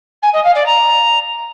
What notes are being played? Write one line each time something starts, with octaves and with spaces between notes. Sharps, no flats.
G#5
D#5
F5
D5
A#5